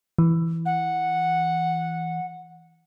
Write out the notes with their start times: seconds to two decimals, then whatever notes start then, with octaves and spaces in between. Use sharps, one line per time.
0.19 E3
0.65 F#5